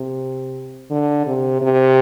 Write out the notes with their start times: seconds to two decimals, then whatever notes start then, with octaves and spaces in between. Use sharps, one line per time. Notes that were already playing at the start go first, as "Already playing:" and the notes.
Already playing: C3
0.91 D3
1.27 C3
1.61 C3